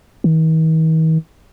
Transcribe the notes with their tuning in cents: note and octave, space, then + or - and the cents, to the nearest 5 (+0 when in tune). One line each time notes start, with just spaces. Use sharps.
D#3 +45